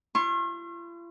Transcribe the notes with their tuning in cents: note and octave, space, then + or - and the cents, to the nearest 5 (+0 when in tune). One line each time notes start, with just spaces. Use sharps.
F4 -45 C#6 -45